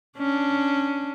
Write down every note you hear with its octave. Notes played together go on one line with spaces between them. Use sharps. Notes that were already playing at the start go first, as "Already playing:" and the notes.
C#4 D4